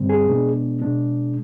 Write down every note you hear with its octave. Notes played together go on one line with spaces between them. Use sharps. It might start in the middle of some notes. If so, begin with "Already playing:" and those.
Already playing: G2 D3 G3 C4
G#4
B2 G#3 B3 D4
B2 G#3 D4